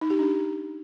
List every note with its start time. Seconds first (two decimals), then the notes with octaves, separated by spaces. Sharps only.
0.01 D#4
0.10 G4
0.19 D4